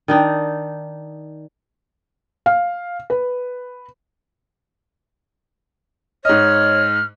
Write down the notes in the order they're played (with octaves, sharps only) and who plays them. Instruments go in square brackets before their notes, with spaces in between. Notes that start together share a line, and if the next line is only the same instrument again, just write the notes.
[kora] D#3 D4 D#4
[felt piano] F5
B4
[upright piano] G#2 D#5 [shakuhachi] C#5 [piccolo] F6